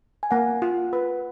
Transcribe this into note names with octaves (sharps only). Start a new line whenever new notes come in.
G#5
A#3 F#5
F4
B4